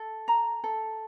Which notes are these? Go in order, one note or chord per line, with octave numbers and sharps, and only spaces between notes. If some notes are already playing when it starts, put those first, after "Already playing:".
Already playing: A4
A#5
A4